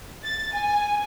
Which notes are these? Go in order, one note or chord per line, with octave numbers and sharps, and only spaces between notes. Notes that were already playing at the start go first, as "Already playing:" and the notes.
A6
G#5